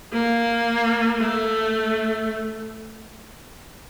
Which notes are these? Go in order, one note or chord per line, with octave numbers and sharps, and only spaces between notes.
A#3
A3